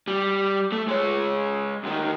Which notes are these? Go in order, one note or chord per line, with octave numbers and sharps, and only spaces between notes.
G3
A3
G#3 C#5
D2 D#3